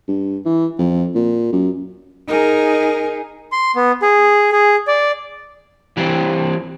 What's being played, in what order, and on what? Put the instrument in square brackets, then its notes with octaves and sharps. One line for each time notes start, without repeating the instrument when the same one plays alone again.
[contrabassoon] G2
E3
F2
A#2
F#2
[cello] D#4 G#4 [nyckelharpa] A#4
[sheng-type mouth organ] C6
B3
G#4
G#4
D5
[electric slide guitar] E3 G3 C4